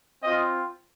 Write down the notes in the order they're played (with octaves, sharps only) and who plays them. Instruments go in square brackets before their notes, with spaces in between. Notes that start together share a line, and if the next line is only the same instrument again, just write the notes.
[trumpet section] C4 F4 D#5